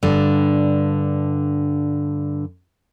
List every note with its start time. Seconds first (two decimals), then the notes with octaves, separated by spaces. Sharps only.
0.03 G2 D3